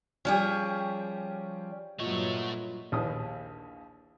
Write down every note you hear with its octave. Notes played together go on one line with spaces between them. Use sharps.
F3 G3 C#4 G4 G#4
G2 A#2 F#3 A3 A#3 F4 C#5 D#5
A#1 D#2 E3 D#6